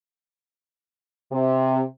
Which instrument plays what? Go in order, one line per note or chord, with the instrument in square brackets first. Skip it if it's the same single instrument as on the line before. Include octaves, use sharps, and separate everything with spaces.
[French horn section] C3